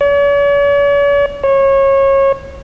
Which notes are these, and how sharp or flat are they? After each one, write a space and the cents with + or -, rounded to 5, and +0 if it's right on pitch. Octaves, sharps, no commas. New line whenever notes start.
C#5 +45
C#5 -25